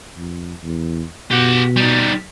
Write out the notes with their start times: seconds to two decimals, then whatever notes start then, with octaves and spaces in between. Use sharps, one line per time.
0.17 F2
0.63 E2
1.31 B2 G4 F#5
1.76 G3 D#4